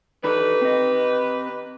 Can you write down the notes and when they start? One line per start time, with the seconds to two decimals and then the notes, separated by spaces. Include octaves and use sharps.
0.24 D#3 D4 D#4 G4 A4 B4
0.62 C4 D#5